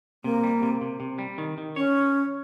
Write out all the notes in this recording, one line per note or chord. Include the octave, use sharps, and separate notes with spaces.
C3 A#3
G3
C3
C3
C3
G3
D#3
D#3
C#4 C#5